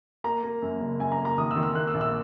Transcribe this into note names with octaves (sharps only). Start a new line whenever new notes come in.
A#3 A#5
A#3
F#2
F#1
F#2 G#5
A#5
A#3
A#5
D#3 D#6
E6
D#3
E6
A#3 F#6
E6
A#1
E6